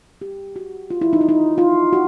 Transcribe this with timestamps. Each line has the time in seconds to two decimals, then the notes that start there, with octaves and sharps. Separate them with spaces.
0.21 G4
0.56 F#4
0.90 F4
1.01 E4
1.13 D#4
1.21 E4
1.29 D#4
1.58 F4
1.93 F#4